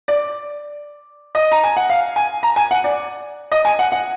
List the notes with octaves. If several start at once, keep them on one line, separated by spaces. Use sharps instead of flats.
D5
D#5
A#5
G#5
F#5
F5
G#5
A#5
G#5
F#5
D5
D#5
G#5
F#5
F#5